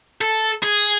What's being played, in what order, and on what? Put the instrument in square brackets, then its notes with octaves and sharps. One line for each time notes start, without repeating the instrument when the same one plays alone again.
[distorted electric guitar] A4
G#4